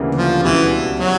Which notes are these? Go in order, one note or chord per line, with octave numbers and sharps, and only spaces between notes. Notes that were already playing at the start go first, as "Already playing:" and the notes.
Already playing: D2 C#3 E3 G3 A#3
F3
C#2 B2 E3 G3
F#3